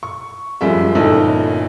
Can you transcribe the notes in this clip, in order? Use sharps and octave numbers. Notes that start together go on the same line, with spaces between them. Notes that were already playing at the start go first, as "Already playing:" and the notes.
C#6
F#2 A2 F3 G3 G#3 E5
G1 A#2 C#4 D#4 E4 A4